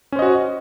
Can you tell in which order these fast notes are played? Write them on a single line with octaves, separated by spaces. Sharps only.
C#4 C5 D#5 F#4